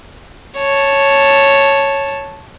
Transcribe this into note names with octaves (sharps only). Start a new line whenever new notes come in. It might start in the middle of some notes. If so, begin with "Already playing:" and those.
C#5 A5